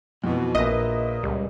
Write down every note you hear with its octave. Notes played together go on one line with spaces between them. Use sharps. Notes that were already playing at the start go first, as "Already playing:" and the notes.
F2 B2 E3
A#1 A#2 B4 D#5 E5
C#2 G3